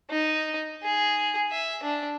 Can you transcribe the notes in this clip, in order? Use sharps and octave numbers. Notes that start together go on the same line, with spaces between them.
D#4
G#4
E5
D4